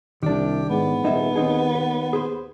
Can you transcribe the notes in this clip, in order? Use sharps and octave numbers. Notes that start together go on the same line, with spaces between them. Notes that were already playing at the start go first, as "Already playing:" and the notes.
C2 D#3 D4 G4
G#2 B3
D#1 D#4 G#4 E5
D#2 C4 D#4 G#4
B4
G#4 B4 C5